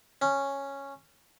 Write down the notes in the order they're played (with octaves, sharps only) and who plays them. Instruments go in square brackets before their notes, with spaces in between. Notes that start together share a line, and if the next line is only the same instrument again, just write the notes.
[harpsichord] C#4